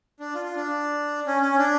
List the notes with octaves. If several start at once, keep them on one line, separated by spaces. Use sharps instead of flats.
D4
F4
F4
D4
C#4
C#4
D4